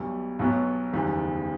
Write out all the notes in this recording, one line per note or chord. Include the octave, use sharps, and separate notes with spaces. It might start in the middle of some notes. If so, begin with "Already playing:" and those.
Already playing: B1 B2 G3
B1 B2 F#3 B3
F#1 E2 D#3 G3 B3